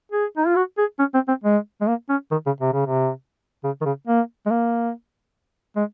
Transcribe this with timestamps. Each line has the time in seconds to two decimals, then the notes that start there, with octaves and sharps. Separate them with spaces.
0.12 G#4
0.37 D#4
0.47 F4
0.56 F#4
0.78 G#4
0.99 C#4
1.14 C4
1.28 C4
1.44 G#3
1.81 G#3
1.87 A#3
2.09 C#4
2.31 D#3
2.46 C#3
2.61 C3
2.73 C#3
2.87 C3
3.64 C#3
3.81 D#3
3.85 C#3
4.08 A#3
4.46 G#3
4.51 A#3
5.76 G#3